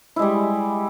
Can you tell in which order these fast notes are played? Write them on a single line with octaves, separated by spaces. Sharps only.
E4 G#3 G3